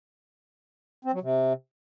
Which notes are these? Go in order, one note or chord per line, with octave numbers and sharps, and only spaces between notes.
C4
F#3
C3